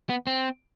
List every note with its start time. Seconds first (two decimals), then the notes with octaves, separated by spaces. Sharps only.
0.09 B3
0.27 C4